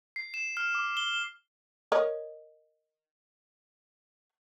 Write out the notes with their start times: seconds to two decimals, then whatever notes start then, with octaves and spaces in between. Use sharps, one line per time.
0.16 C7
0.34 E7
0.57 F6
0.75 D6
0.97 G7
1.92 A#4 C#5 D#5